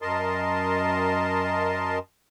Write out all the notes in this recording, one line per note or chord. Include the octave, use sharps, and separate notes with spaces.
F#2 A#4 D#5 A5 C6